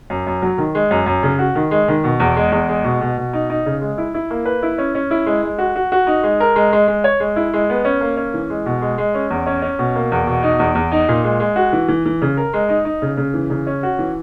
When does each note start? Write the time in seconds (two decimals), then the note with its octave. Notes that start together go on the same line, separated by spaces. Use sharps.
0.10 F#2
0.27 F#2
0.42 F#3
0.58 D#3
0.75 G#3
0.91 F#2
1.06 F#2
1.23 C#3
1.39 F#4
1.55 D#3
1.71 G#3
1.88 D#3
2.04 B2
2.20 E2
2.37 G#3
2.52 E2
2.69 G#3
2.84 B2
3.01 B2
3.17 B2
3.33 D#4
3.50 D#4
3.66 C#3
3.81 G#3
3.98 E4
4.14 E4
4.30 A#3
4.45 B4
4.63 E4
4.78 C#4
4.95 C#4
5.11 E4
5.26 G#3
5.42 G#3
5.58 F#4
5.76 F#4
5.92 F#4
6.07 D#4
6.23 G#3
6.40 A#4
6.56 G#3
6.73 G#3
6.88 G#3
7.04 C#5
7.20 G#3
7.36 E4
7.53 G#3
7.70 B3
7.85 C#4
8.01 A#3
8.17 C#4
8.34 E3
8.50 G#3
8.66 B2
8.82 G#3
8.98 G#3
9.14 C#4
9.30 E2
9.46 C#4
9.62 C#4
9.79 B2
9.96 A#3
10.12 E2
10.27 B2
10.43 D#4
10.59 E2
10.75 E2
10.92 D#4
11.09 A#2
11.24 G#3
11.40 G#3
11.56 F#4
11.72 E3
11.88 E3
12.05 E3
12.22 C#3
12.37 A#4
12.53 G#3
12.69 D#4
12.85 D#4
13.02 C#3
13.17 C#3
13.34 E3
13.50 C#3
13.67 C#4
13.83 F#4
13.99 E3